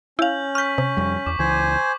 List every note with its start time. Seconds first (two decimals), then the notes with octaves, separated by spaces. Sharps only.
0.19 C#4 E4 F5 G6 F#7
0.55 C#6 F6 G6 B6
0.78 C3
0.97 F2 G3
1.26 E2 D6
1.39 C#2 E3 C5 G#5